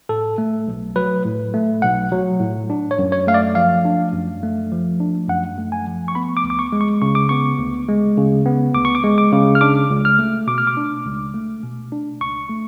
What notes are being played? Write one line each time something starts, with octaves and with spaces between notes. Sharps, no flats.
A2 A4
A3
B1
F#3 B4
A2
A3
B1 F#5
F#3
A2
D4
C#5
F#2
C#5
A3 F5
D5
F3 F5
D4
F#2
A3
F3
D4
F#2 F#5
A3
G#5
F3
C#6
B3 B5
D6
D2
D6
C#6
G#3
C#6
C#3 C#6
D6
B3 C#6
D2
G#3
C#3
B3
D2 D6
C#6
D6
G#3
D6
C#3
F6
D4 D6
C#2
F6
A3
B2 D6
F6
D6
D4
C#2
A3
B2
D4
C#2 C#6
A3